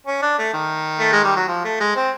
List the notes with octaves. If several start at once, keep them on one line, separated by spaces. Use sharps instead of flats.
C#4
D4
A3
D#3
A3
G#3
G3
F#3
F3
A3
G#3
C4